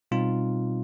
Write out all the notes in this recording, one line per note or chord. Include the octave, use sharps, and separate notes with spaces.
B2 G3 C4 D#4 F4